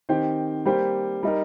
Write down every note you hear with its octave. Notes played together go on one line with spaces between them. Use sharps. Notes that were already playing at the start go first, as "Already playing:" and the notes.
D#3 C4 G4 C5
G3 A#3 G4 C5
G3 D#4 A#4